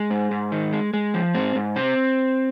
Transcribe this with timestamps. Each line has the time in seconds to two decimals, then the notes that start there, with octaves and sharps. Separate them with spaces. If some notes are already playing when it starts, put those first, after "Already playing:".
Already playing: G#3
0.10 G#2
0.31 G#2
0.52 D#3
0.73 G#3
0.93 G#3
1.14 F3
1.35 G#2 C4
1.55 G#2
1.76 C3 C4